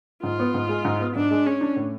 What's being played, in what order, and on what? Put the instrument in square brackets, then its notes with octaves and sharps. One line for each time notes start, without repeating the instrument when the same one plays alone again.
[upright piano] G#2 [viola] F4
[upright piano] B3
G#2
G#3
G#2
B3
[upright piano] G#2 [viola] D4
[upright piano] G#3
[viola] C#4 [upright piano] G#4
[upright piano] D4
A2